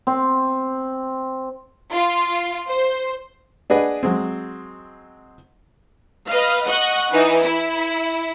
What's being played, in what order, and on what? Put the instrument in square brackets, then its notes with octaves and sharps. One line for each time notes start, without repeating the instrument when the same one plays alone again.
[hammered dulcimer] C4
[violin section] F4
C5
[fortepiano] D4 G#4 B4 D#5 F#5
F#3 G#3 C4
[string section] B4 D#5 F5
D#5 F#5 C#6
E3 D#4
E4